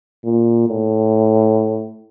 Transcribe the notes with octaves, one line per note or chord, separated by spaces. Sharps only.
A#2
A2